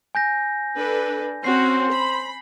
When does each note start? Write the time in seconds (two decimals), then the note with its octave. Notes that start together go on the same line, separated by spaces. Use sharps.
0.15 G#5 G6 A#6
0.76 D4 A4 B4
1.44 C4 C#4 F#4 C5 C7
1.90 B5